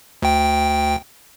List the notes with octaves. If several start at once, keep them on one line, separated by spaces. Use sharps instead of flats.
D2 G5